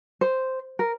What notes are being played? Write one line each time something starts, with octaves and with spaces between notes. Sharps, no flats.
C5
A#4